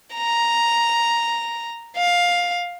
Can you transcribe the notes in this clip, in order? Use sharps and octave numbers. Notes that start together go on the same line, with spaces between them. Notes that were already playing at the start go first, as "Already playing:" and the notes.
A#5
F5